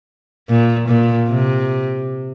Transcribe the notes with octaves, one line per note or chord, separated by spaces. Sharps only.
A#2
A#2
C3